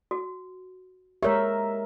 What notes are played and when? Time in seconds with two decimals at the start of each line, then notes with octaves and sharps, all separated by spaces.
0.11 F#4
1.23 G#3 G4 A#4 C#5 E5